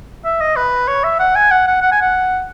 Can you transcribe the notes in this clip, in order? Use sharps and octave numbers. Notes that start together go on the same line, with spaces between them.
E5
D#5
B4
C#5
E5
F#5
G#5
F#5
F#5
F#5
G#5
F#5